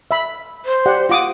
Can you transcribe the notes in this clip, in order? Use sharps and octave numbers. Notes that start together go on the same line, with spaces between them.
E5 B5
C5
G4 D5 F#5
F4 F#5 D6 D#6